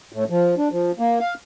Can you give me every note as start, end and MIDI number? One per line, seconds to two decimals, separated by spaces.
0.12 0.24 45
0.30 0.55 53
0.58 0.68 62
0.72 0.91 53
0.99 1.19 58
1.20 1.34 77